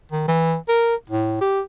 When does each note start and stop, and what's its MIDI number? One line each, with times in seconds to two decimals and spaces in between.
0.12 0.24 51
0.28 0.55 52
0.68 0.95 70
1.09 1.40 45
1.41 1.61 67